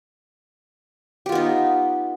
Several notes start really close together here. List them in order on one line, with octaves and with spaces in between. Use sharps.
G4 F4 B3 D#4